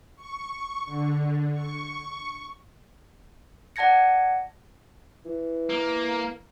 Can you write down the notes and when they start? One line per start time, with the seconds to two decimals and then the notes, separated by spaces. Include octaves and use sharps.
0.16 C#6
0.85 D3
1.53 C#6
3.76 D5 F#5 A5 G#6 A#6 C#7
5.25 E3
5.70 A#3